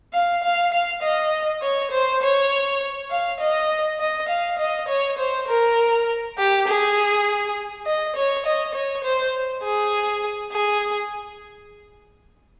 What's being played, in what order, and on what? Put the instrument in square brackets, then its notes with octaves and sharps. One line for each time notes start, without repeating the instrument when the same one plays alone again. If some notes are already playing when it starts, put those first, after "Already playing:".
[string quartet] F5
F5
F5
D#5
C#5
C5
C#5
F5
D#5
D#5
F5
D#5
C#5
C5
A#4
G4
G#4
D#5
C#5
D#5
C#5
C5
G#4
G#4